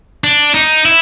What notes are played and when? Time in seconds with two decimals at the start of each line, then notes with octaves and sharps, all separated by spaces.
0.24 D4
0.54 D#4
0.85 E4